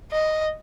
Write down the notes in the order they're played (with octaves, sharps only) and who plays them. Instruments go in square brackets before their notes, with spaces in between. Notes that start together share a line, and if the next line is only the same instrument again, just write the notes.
[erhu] D#5